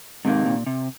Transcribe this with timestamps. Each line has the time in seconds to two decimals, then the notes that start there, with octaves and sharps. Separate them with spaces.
0.25 G#2 C3 D#3 A#3
0.46 A#2
0.67 C3